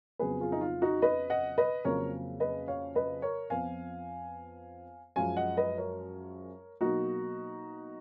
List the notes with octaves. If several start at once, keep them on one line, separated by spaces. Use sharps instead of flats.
F2 C#3 F#3 B3 G#4 B4
F4 G#4
D#4
F4
D#4 F#4
B4 D#5
D#5 F#5
B4 D#5
F2 C#3 F#3 A#3 A#4 C#5
B4 D#5
C#5 F5
B4 D#5
A#4 C#5
F2 F3 B3 F5 G#5
F#2 F3 G#3 F5 G#5
D#5 F#5
B4 D#5
A#4 C#5
B2 F#3 A#3 D#4 F#4